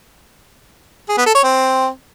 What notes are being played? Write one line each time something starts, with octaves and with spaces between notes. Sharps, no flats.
G#4
B3
A4
C#5
C4